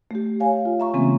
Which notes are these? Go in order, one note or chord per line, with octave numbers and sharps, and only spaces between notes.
A3 G4
C#5 F5 G#5
F4
E5 A#5 C#6
C#3 E3 G#3 A#3 C4 C#4